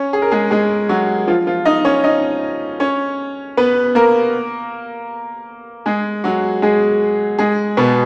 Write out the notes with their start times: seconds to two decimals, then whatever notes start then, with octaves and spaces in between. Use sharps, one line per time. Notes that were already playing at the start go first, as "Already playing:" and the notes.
Already playing: C#4 C#5
0.13 G#4
0.22 A#4
0.32 G#3 G#4
0.51 G#3 G#4
0.89 F#3 F#4
1.27 F3 F4
1.47 F3 F4
1.65 D#4 D#5
1.85 C#4 C#5
2.04 D#4 D#5
2.80 C#4 C#5
3.57 B3 B4
3.95 A#3 A#4
5.86 G#3 G#4
6.24 F#3 F#4
6.62 G#3 G#4
7.39 G#3 G#4
7.77 B2 B3